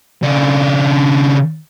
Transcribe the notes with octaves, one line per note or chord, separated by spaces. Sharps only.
C#3 D4